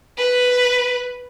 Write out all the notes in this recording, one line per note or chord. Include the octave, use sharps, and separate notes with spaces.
B4